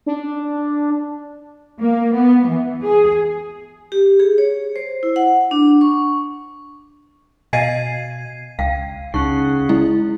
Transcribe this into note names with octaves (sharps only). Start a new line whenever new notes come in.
D4
A#3
B3
E3
G#4
G4
G#4
C#5
C5
E4
F#5
D4
C#6
B2 D#5 F5 G#5 G#6 C7 D#7
C#2 F5 G5
C#2 C#3 D#4 F#5 C#6
G#3 E4